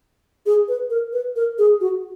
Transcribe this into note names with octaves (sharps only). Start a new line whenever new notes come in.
G#4
B4
A#4
B4
A#4
G#4
F#4